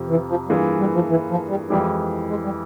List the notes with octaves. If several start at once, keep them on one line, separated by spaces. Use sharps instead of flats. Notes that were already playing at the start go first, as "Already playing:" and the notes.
Already playing: F2 C3 F3 C4
E3
F3
G2 E3 G3 A#3 F4 G#4
G3
F3
E3
F3
G3
F2 E3 G3 G#3 E4 G4
G#3
G3